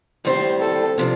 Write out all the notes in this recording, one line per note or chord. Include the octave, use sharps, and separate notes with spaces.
A2 G3 C4 C5
A4
C3 F3 D4